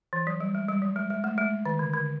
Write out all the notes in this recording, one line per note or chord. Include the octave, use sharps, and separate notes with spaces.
E3
F#3
G3
G#3
G3
F#3
G#3
G#3
A3
G#3
D#3
D3
D3